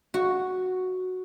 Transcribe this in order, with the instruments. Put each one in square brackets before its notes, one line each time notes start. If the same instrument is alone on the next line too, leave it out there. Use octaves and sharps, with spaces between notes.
[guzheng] F#4